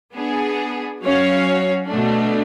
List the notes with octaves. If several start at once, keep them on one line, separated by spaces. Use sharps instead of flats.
B3 D4 G#4
F#3 C#4 F#4 C#5 F5
B2 A3 D4